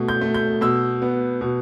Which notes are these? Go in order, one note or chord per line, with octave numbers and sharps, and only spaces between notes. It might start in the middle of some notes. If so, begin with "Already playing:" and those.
Already playing: B2 A3
G6
A3
G6
B2 E6
B3
B2